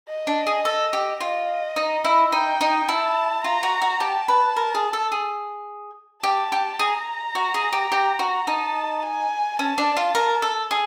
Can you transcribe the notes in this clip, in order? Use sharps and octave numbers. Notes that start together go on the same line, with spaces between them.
D#5
D4
G#4
A4
G4
F4 D#5
D#4
E4
D#4 G5
D#4
E4 A5
F4 A#5
F#4
F#4
G4 A5
B4
A#4
G#4
A4
G#4
G4 A5
G4
G#4 A#5
F#4
G#4
G4
G4
F#4
D#4 A5
G#5
C#4 A5
D4
F4
A#4
A4
G#4